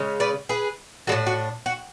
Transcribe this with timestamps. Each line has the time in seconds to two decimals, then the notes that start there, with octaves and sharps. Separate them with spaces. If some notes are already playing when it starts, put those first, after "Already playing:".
Already playing: C#3 G#3 C#4
0.20 B4 D5
0.49 G#4 B4
1.07 G#3 D4 F#4 A4
1.12 A2
1.27 F#4
1.66 F#4